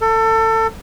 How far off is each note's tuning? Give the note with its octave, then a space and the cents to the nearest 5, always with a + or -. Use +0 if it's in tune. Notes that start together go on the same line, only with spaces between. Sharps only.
A4 +25